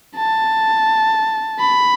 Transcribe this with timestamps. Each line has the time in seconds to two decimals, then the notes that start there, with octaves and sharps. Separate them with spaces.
0.17 A5
1.59 B5